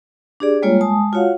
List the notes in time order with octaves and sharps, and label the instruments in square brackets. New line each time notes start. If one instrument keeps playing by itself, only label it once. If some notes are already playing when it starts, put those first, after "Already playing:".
[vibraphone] D4 G4 G#4 D5
G3 G#3 A#3 F4 C#5
G#3 G#5 A5 D#6
F4 F#4 C#5 F5 F#5